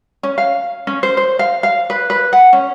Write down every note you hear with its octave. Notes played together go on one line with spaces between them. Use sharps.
C#4
F5
C#4
C5
C5
F5
F5
B4
B4
F#5
C#4